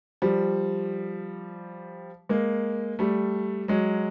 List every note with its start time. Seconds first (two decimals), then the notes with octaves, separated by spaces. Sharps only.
0.22 F3 G3
2.29 G#3 A#3
2.99 G3 A3
3.68 F#3 G#3